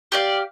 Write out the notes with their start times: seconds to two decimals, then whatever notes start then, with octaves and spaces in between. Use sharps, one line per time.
0.12 G4 D5 F5